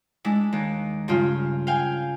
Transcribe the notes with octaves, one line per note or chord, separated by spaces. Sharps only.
G#3 D4 E4
D#2
G2 C#3 F4
F5 G5 G#5